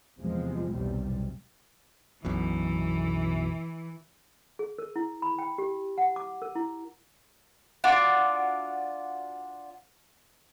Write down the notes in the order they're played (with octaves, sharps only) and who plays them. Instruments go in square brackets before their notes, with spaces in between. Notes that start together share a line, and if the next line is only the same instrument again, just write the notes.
[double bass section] E2 C3 F3 G#3
B1 E2 C3 G3
[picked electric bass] B1 F#2 B2 [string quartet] E3
[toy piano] G#4
A#4
E4
B5
G5
G4
F#5
D6
A#4
E4
[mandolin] D4 F4 F#4 D5